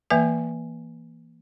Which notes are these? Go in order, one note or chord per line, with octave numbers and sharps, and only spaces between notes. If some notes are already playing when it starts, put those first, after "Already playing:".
E3 A#3 B4 E5 G#5